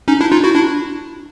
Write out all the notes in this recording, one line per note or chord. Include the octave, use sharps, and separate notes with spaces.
C#4 D#4
D4 E4
D#4 F4
E4 F#4
D4 E4